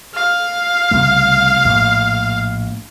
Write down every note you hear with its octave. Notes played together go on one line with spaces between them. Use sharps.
F5
C2 C#3 A3
A#1 A2 A3